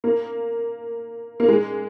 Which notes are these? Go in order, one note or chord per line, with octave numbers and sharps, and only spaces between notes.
A#3
A#3
G#3